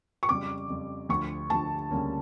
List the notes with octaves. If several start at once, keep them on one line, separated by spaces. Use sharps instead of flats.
C#6
F2 C#3 G3 D6
F2 C#3 G3
D2 D3 F3 C#6
D2 D3 F3 A5
D2 C#3 G3 A#3 C#4